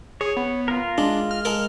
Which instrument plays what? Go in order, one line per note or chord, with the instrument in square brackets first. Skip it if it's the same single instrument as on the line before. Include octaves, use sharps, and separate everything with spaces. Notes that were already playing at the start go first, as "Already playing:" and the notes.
[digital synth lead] G#4 [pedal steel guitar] C#5
[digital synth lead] B3
[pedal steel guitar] F4 A#4
[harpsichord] G#3 [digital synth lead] D4
[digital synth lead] F6
[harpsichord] G#3 A4 A#4